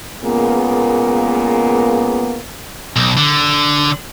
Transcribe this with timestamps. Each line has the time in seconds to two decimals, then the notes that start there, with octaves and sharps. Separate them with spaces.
0.23 A#2 C#3 G#3 A#3 B3
2.96 B1
3.17 D3